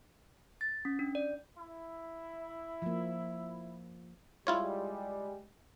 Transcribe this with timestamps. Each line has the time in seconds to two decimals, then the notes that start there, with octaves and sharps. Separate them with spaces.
0.61 A6
0.85 C#4
0.99 D4
1.15 D5
1.57 E4
2.82 F3 A#3
4.47 G3 G#3 E4 F4 C#5